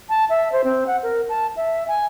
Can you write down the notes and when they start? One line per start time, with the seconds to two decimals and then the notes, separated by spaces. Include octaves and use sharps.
0.09 A5
0.30 E5
0.52 C5
0.64 C4
0.87 F#5
1.03 A#4
1.29 A5
1.56 E5
1.88 G#5